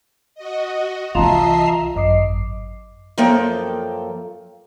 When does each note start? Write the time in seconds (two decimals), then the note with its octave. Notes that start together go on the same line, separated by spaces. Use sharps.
0.35 F#4 D#5
1.15 C2 E3 F4 D#5 E5 A5 A#5 C7
1.94 G#1 F#2 D#5 D6 C7
3.18 F#2 F3 A#3 A4 G5